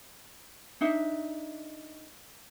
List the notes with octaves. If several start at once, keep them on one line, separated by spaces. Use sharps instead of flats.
D4 D#4 E5